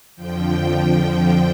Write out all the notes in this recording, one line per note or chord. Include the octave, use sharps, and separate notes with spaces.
F2 D3 F3 G5